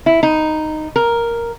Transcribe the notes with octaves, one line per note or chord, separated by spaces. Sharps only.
E4
D#4
A#4